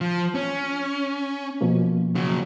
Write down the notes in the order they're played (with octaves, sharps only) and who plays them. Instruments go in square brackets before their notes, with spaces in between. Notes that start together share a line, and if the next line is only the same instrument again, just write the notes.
[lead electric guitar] F3
C#4
[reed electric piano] B2 F3 A#3
[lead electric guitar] C#3 F#3